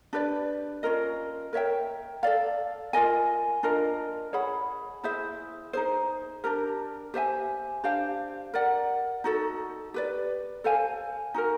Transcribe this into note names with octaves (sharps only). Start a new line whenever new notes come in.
D4 G4 B4 D5
C#4 F4 A#4 D#5
A#4 C#5 E5 G5
A4 D5 F5
F4 A#4 D#5 G#5
D4 F4 A#4 D#5
G#4 C#5 F#5 B5
E4 G#4 C5 E5
D#4 G#4 C5
D4 G4 A#4
G4 C5 E5 G#5
D4 G4 C5 F5
A#4 D5 F#5
D#4 F#4 A4
G4 B4 D5
A4 C5 F5 G#5
D#4 F#4 A#4